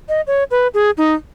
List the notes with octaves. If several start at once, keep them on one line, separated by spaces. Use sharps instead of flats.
D#5
C#5
B4
G#4
D#4